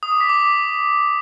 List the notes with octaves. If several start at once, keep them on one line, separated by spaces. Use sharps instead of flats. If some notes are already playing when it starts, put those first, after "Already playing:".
D#6
D6
B6
D6